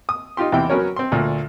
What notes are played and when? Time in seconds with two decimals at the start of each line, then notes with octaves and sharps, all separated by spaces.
0.09 D#6
0.37 D#4 F4 G4 C6
0.52 E2 C3 E4 G5
0.70 F#3 B3 C#4 F#4 A#4 C#5
0.96 C4 C6
1.12 D2 A#2